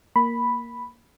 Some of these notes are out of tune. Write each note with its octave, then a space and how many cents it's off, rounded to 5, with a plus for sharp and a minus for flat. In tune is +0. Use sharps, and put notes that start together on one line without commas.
A#3 +0 B5 +0